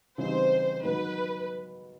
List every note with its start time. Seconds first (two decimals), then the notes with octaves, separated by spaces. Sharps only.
0.18 C#3 E3 G3 C4 D#4 C5
0.83 G#2 D#3 F#3 B3 D#4 B4